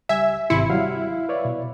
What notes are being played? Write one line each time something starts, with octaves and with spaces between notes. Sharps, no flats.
C#2 G3 E5 G#5
G#1 C3 E4 C6 C#7
F#3 G3 F5
B4 C#5 D5
B2